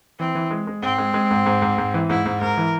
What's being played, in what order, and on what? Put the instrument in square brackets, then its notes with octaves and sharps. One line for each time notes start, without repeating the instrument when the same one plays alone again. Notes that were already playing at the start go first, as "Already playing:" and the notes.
[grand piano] E3 [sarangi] C4
[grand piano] E3
G#3
G#3
[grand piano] G#2 [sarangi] C4
[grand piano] G#3
G#3
G#2
G#2
G#2
G#2
E3
[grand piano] G#2 [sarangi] E4
[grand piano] G#2
[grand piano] G#2 [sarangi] A#4
[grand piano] E3